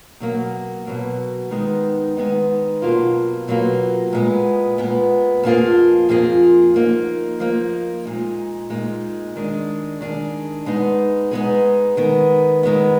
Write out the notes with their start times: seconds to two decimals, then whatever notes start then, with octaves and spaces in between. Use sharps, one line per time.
0.20 B2 F#3 A#3
0.86 B2 F#3 A#3
1.51 D#3 G#3 B3 D#4
2.17 D#3 G#3 B3 D#4
2.82 B2 F#3 A#3 F4
3.48 B2 F#3 A#3 F4
4.13 A#2 G#3 B3
4.78 A#2 G#3 B3
5.43 F2 F3 A#3 F4 G#4
6.09 F2 F3 A#3 F4 G#4
6.74 F3 A#3 D#4
7.40 F3 A#3 D#4
8.05 A#2 G#3 D#4
8.70 A#2 G#3 D#4
9.36 D#3 G#3 D4 G#4
10.01 D#3 G#3 D4 G#4
10.66 G#3 B3 D#4 G#4
11.31 G#3 B3 D#4 G#4
11.97 D#3 G#3 B3
12.63 D#3 G#3 B3